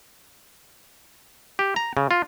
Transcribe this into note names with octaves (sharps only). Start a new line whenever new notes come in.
G4
A#5
C#3
F4